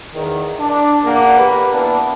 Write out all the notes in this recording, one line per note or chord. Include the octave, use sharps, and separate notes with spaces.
E2 D#3
D4
E2 A#2 A#3 F#5
G4 B4
A#3 B3 D4 E4